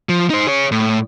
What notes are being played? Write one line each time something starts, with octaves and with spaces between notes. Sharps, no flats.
F3
D#4 C5
G#4 C#5
A2